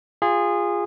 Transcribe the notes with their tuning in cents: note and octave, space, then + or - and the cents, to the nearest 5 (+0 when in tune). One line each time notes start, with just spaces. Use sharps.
F4 +0 G#4 -20